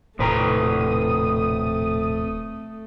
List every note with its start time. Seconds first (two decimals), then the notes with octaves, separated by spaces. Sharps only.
0.19 D#1 F2 A2 C3 A3 B4 A#5 D#6